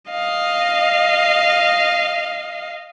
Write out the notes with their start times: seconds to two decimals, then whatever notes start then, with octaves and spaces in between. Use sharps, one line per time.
0.11 D#5 F5